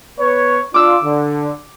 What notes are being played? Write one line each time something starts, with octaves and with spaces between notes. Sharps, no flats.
B3 B4 C#5
D4 F4 D6 E6
D3